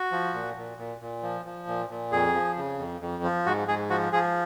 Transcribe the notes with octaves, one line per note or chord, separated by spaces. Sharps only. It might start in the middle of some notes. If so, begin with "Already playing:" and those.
Already playing: F#4
F3
A#2
A#2
A#2
A#2
F3
F3
A#2
A#2
F2 G#4
F3
C#3
F2
F2
F3
G#2 F#4
G#2 G#4
F3 F#4
F3 G#4